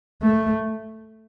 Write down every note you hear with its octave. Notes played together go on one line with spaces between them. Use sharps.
A3